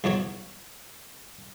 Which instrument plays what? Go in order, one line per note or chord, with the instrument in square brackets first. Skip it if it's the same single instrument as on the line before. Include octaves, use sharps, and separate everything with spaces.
[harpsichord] B1 E2 F#3 C#5